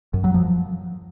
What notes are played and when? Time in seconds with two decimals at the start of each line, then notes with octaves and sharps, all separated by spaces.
0.14 F#2
0.24 F#3
0.34 F3